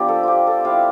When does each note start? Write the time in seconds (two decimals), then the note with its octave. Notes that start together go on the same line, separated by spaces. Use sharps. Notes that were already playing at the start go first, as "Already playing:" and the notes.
Already playing: F3 B3 D4 G4
0.09 A4
0.23 F4 G4
0.47 A4
0.65 G3 C4 E4 F5